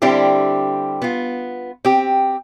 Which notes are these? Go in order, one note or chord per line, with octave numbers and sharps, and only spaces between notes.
D3 G3 C4 D4 E4 G4
B3 F4
C4 G4